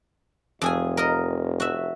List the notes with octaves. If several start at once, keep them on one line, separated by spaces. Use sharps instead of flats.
F1 F2 G#4 G#5
A#4 D#5
F#4 E5